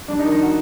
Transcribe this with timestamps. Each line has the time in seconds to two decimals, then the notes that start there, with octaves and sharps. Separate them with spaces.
0.08 G3 D4
0.19 D#4
0.24 D#3
0.32 D#4
0.42 F#4